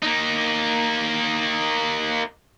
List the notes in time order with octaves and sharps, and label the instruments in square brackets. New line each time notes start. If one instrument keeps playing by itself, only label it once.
[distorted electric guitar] A#3 D#4